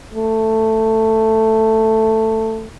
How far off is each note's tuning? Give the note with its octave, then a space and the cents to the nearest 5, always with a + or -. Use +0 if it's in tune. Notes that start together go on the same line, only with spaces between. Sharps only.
A3 +10